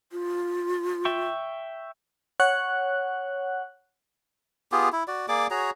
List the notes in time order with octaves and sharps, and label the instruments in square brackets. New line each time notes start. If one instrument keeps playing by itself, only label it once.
[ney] F4
[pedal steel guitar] E5 G5 C#6
[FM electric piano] C#5 F#5 F#6
[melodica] B3 F4 G4 G#4
E4
F#4 D5
A#3 G#4 D5 D6
F#4 G#4 C#5 A#5